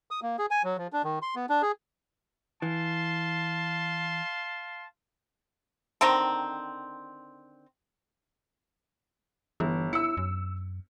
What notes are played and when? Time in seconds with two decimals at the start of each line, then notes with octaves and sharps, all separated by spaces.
0.11 D#6
0.22 A#3
0.38 G#4
0.51 G#5
0.64 F#3
0.77 F3
0.93 D4
1.04 D#3
1.22 C6
1.36 B3
1.49 D4
1.62 G#4
2.62 E3 F5 A5 C6
6.01 D3 D#3 C4 A#5
9.60 G1 E3
9.93 E4 E6 C#7
10.17 F#2